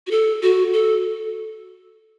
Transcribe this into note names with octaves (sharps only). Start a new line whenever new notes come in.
F#4
A4
F#4
A4